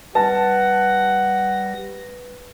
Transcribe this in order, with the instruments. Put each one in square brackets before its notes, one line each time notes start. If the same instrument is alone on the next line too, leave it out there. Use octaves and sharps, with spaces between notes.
[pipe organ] G3 A#6 [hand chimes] B4 [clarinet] F#5 [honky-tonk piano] A5